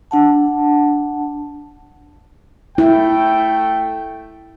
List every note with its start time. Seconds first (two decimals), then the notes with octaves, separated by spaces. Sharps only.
0.11 D4 F#5 A5
2.78 A3 E4 G5